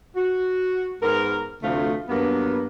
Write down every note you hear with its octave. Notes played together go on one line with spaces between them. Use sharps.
F#4
G#2 B3 A#4
D2 C3 F3 A3 F4
G2 F#3 A#3 B3